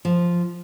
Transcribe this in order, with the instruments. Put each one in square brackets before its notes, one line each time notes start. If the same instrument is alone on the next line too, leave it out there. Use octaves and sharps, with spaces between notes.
[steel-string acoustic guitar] F3